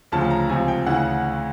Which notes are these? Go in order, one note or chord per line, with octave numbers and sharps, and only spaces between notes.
D2 C#3 F3 A5
A#5
C#2 C3 F3 G#5
G5
D2 C#3 E3 F#5